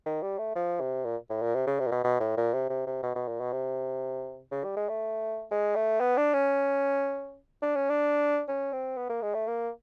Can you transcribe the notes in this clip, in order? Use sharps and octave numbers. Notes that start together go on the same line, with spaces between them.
D#3
G3
A3
F3
C3
A#2
A2
A#2
C3
C#3
C3
A#2
B2
B2
A2
A#2
C3
C3
C3
B2
B2
A#2
B2
C3
C#3
G3
G#3
A3
G#3
A3
B3
D4
C#4
D4
C#4
D4
C#4
C4
B3
A#3
G#3
A3
A#3